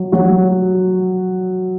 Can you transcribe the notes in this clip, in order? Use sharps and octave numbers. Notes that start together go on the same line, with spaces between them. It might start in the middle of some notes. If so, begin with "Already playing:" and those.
Already playing: F#3
F#3 F#4